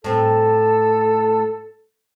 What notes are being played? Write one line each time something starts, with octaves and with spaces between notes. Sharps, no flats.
A2 C4 A4 A5